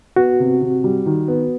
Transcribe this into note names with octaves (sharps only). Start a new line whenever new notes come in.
B3 F#4
C3
C3
G3
D#3
B3